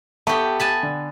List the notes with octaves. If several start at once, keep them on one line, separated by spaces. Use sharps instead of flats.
B3 G4 A4 E5 C#6
G#5 A5 B5
D3